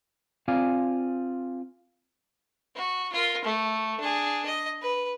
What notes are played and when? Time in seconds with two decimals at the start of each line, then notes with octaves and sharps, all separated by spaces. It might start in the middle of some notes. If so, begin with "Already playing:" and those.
0.48 C4 F4 G#4 D5 F5 G#5
2.76 F#4
3.12 F4 A#4
3.44 A3
4.00 D4 G#4
4.45 D#5
4.81 B4